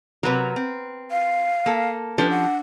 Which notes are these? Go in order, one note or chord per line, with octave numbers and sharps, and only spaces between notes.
C3 F#3 A#4 B4
C4
F5
A#3 A4
F3 C#4 D4 G4 A4 B4 G5
F#5